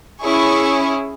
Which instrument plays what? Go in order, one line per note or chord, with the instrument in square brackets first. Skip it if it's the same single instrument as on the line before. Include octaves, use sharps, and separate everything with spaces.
[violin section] C#4 E4 G#4 C#6